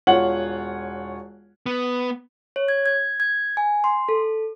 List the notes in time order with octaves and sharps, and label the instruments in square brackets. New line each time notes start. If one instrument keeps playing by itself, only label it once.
[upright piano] E1 F4 C#5 F#5 F#7
[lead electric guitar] B3
[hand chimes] C#5
G#6
G#6
G#6
G#5
C6
A4